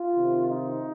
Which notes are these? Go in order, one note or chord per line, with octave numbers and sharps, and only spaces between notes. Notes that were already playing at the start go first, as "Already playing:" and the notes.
Already playing: F4
C3 D#3 C4
D#4